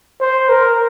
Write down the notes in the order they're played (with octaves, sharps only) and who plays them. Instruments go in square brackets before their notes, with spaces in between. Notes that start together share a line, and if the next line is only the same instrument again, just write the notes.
[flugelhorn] C5
A#4